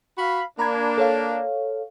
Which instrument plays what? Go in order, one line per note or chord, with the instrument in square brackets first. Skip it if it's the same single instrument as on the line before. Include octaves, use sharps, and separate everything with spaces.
[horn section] F#4 F5 B5
[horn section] A#3 D4 [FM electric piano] A#5 B5 G#6
[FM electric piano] A4 C#5 F5